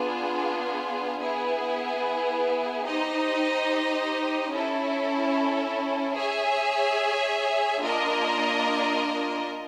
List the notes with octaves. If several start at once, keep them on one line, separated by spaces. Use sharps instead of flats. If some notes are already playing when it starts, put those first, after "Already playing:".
Already playing: B3 D4 F4 G#4
B3 E4 G#4
D#4 G4 C5 D#5
C#4 E4 A4
G#4 C#5 E5 G#5
A#3 D4 F4 A#4 D#5